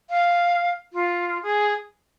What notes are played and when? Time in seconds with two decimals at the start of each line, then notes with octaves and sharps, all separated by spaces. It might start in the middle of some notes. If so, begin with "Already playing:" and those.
0.10 F5
0.93 F4
1.43 G#4